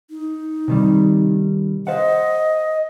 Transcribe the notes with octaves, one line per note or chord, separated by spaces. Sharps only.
D#4
C3 D#3 G3
C5 D#5 F5 F#5